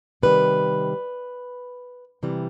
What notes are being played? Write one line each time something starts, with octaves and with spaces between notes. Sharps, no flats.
C3 D#3 G3 B4
C3 E3 G3